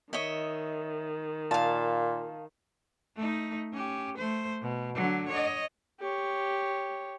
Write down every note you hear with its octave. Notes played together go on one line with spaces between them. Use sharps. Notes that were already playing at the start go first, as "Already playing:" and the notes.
D#3 C#5 D#5 E5
A#2 F5 A5
A3 D#4
C#4 G4
A3 C5
B2
D3 F#3
C#5 D#5
G4 C#5